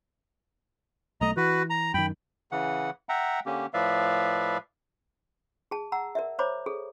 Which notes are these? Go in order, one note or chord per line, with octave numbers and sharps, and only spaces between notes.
B1 A3 D#5 A#5
E3 F#4 B4
A#5
F#2 D#3 G5 B5
C#3 E3 F#5
E5 F#5 G5 A#5
D3 A#3 C#4 G4
A2 F3 B4 D5 E5 F5
G#4 A5
F#5 A#5 E6
A#4 D5 E5
C5 C#5 A#5 B5 D6
G#4 A4